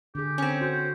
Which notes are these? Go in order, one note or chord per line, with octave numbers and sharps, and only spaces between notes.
D3 G4 G#4
C4 C#4
F#4 C5